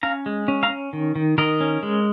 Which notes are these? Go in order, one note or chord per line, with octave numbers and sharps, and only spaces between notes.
C#4 F5 A#5
G#3
C#4
F5 A#5
C#4
D#3
D#3
D#3 A#4 D#5
C#4
G#3